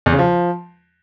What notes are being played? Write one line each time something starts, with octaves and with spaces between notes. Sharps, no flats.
E2
C#3
F3